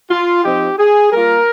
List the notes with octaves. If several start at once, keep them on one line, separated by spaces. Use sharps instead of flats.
F4
F3 C4 D#4 G4
G#4
G3 A#3 F4 A#4